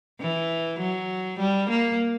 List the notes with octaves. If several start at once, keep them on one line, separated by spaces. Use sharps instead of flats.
E3
F#3
G3
A#3